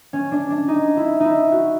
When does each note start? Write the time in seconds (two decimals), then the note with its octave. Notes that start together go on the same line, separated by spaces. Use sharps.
0.13 C#4
0.32 D4
0.50 D4
0.68 D#4
0.97 E4
1.20 D#4 E4
1.52 F#4